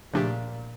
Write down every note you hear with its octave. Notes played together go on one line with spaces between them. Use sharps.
A#2 C#3 F3 A3 D4 G4